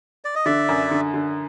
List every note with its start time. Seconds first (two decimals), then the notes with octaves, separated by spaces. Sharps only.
0.25 D5
0.35 D#5
0.45 D3 D5 E5
0.69 F#2
0.91 D3
1.14 D3